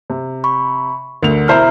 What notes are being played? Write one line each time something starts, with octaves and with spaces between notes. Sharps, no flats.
C3
B5 C#6
D2 D3 A#4 F7
E1 E4 C5 E5 A#5 F6